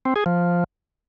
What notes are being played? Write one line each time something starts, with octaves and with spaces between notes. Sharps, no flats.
C4
G#4
F3